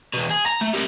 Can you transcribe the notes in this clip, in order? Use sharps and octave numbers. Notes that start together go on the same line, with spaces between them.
E2 B2
G#4
A#5
A3
G3 A#4